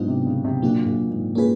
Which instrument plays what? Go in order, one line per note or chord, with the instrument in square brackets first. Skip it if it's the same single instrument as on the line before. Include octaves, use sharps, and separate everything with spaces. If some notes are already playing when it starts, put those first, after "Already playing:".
Already playing: [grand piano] G#2 B2 [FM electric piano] F#3 B3 D4 F4
[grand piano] C3
C#3
C3
[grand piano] A#2 [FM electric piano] F#3 A#3 D4 F#4
[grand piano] A#2
G#2
[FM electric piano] A#3 C#4 F4 G#4 B4